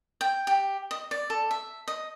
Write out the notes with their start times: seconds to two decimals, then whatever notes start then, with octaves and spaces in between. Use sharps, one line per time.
0.21 G5
0.47 G4
0.91 D#5
1.11 D5
1.30 A4
1.51 E5
1.88 D#5